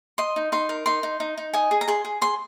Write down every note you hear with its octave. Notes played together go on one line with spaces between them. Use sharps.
D#5 C6
D#4
D#4 C6
A#4
D#4 C6
D#4
D#4
D#4
D#5 G#5
G#4
A#5
G#4 C6
G#4
G#4 C6